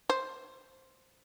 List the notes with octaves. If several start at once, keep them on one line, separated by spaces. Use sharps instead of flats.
C5